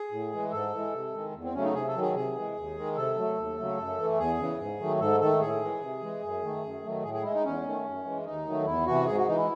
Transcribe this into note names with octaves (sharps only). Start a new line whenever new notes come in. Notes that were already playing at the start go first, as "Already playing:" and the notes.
Already playing: G#4
A2
E3 G#3
G#2 A4
E3 G#3
C3
D#3 G#3
E2
C4
C#3 F#3 A3 C#4
D#4
C3 G#4
A4
D#3 F#3
G#4
C3 G#4
E3 G#3
D#2
D#3 G#3
C3 A4
F#3 A3
D#2
C#3 F#3 A3
F#2
E3 A3
E2 G#4
C#3 E3
G#2
D#3 F#3 A3
G#2 A4
D#3 A3 A4
A2 G#4
E3 G#3
C3
E3 G#3
F#2
D#3 A3
F#2
D#3 F#3 A3
A2 G#4
G#4
G#3 E4
D#4
E2 C#4
D#3 A3
F#2
E3 G#3
D#2 D#4
D#3 F#3 A3
E2 E4
C3 E3 F#4
G#2 G#4
F#4
E3 G#3 D#4
E4